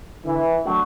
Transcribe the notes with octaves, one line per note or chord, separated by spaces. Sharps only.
D3 E3
F#3 A3 D4 F#4